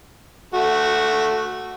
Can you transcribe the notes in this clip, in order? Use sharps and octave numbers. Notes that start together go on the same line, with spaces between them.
A3 F#4